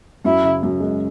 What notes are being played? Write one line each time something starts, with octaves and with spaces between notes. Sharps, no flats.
F#2 E4
C#3
F#2
G#3